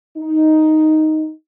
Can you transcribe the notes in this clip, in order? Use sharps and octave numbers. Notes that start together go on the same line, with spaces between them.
D#4